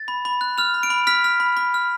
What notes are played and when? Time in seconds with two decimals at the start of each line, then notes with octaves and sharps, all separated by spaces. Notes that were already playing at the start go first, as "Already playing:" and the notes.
Already playing: A6
0.08 B5
0.25 B5
0.41 F#6
0.58 F6 F7
0.74 B5
0.83 D7
0.90 B5
1.07 F6 B6
1.24 F6
1.40 B5
1.57 B5
1.74 F6